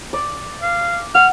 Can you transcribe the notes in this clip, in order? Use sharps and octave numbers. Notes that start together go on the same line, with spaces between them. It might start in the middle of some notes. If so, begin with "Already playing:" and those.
D5
F5
F#5 F6